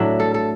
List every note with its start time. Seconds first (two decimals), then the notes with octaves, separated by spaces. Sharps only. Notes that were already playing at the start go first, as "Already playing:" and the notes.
Already playing: A2 F#3 D4 E5
0.20 A4
0.34 A4